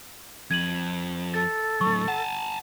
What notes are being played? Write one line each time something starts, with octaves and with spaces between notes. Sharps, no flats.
F2 G#6 D#7 F#7
A4 A6
A2 F#3 C#6
F#5 G#5 A5